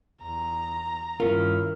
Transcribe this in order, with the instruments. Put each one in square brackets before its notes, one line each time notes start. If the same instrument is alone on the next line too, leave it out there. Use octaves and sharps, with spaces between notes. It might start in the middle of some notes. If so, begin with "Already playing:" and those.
[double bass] E2 [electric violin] A#5
[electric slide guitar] G2 C#4 F4 [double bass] D#3 E4 [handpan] A#4